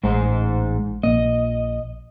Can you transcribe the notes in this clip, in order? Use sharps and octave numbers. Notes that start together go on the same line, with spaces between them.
A1 G#2 G#3 C5
A#1 A#3 D#5